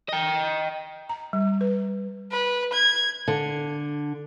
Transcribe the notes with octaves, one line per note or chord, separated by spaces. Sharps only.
D#5 G5
A#5
G3
B4
B4
G#6
D3